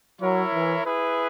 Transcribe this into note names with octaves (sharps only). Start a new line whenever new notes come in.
F#3 E4 A#4 C#5 E5
E3
E4 G#4 B4